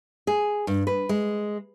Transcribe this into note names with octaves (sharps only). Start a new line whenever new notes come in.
G#4
G2
B4
G#3